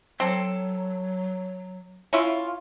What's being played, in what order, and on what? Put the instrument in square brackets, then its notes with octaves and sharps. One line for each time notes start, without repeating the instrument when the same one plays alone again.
[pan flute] F#3 [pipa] C4 A4
[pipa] C#4 E4 F4